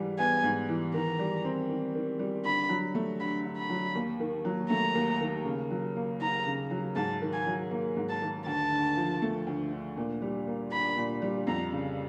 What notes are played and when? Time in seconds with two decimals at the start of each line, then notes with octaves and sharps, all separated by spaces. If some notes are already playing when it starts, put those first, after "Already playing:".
Already playing: G#2 E3 G3
0.19 B3 G#5
0.44 G#2
0.69 E3
0.94 D#3 A#5
1.19 G3
1.44 C4
1.69 D#3
1.95 D#3
2.19 G3
2.45 D3 B5
2.69 F#3
2.95 A3
3.20 D3 B5
3.45 D3
3.57 B5
3.70 F#3
3.95 D#2
4.20 D#3
4.45 F#3
4.70 A3 A#5
4.95 D#2
5.21 D#3
5.45 C#3
5.70 F#3
5.96 A#3
6.20 D#4 A#5
6.46 C#3
6.71 F#3
6.96 G#2 A5
7.22 D#3
7.33 G#5
7.46 F#3
7.71 A#3
7.97 G#2
8.09 A5
8.22 D#3
8.46 D2 A5
8.71 D3
8.96 F3
9.22 A3
9.47 D2
9.72 D3
9.97 A#2
10.22 G3
10.47 A#3
10.72 D4 B5
10.97 A#2
11.22 G3
11.47 F2 A#5
11.73 C#3